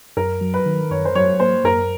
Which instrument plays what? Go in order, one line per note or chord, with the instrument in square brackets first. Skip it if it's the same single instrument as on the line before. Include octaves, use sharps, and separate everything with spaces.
[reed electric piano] F#2 [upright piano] A#4
[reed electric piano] F#3
[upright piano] B4
[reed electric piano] D#3
[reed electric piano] F#2 [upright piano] C#5
[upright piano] C5
[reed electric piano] F#3 [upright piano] C#5
[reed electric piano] A#3 [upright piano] C5
[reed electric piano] F#2 [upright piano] A#4